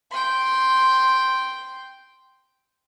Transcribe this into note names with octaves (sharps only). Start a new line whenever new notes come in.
G5 C6